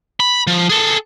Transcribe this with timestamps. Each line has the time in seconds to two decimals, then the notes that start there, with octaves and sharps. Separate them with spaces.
0.20 B5
0.47 F3
0.70 G#4 A4